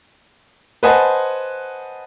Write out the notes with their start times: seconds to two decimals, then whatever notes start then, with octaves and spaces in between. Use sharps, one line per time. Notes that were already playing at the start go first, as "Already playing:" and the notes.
0.83 B4 C5 D#5 F#5 G#5 A5